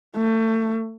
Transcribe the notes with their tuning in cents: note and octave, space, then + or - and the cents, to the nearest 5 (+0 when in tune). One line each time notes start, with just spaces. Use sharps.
A3 +30